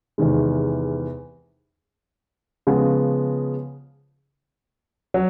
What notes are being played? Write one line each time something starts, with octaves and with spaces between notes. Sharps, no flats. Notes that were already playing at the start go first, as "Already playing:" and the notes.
E2 C3 D#3 G#3
C#3 F3 G#3 B3
F#3